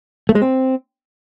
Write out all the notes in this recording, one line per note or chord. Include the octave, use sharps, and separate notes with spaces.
A3
G#3
C4